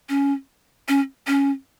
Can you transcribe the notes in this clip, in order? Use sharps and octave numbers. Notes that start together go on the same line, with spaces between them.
C#4
C#4
C#4